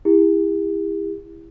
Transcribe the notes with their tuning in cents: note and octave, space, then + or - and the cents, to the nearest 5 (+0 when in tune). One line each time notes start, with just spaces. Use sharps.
E4 +0 G4 +45